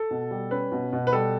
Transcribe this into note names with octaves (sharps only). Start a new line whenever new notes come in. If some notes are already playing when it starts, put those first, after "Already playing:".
Already playing: A4
B2
G3
C#4 B4
B2
B2
B4
G3 A4